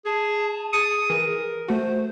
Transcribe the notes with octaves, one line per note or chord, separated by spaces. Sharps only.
G#4 A5
G#4 D#6 A6 C#7
E3 A#4
A3 F#4 C5